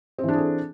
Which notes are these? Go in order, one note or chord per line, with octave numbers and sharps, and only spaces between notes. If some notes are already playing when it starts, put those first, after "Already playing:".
E3 C4 D4 G#4 A4